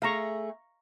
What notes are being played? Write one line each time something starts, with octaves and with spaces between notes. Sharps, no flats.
A3 G#4 F5 A#5 C#6